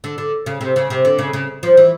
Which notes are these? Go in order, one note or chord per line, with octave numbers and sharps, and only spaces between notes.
D3
D3
C#3
C3
C#3
C3
D3
C#3
C#3
F3
E3